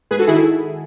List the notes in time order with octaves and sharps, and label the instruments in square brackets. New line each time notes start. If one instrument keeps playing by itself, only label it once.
[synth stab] G#2 G#4 B4
F#4 A4
D#3 E4 G#4